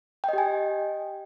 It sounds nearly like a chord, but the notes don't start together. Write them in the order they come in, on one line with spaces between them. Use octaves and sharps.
G5 D#5 G4 G#5